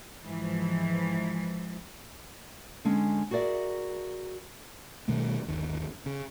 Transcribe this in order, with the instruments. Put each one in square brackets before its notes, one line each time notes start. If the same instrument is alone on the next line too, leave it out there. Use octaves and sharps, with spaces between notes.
[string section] G#2 E3 F3
[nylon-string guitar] D3 G#3 C#4
F#4 G#4 A#4 D5 E5
[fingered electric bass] B2 D#3 G3 A3
G1 D#2
C#3